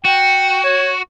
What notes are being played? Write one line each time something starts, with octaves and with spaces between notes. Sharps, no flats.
F#4 G5
C#5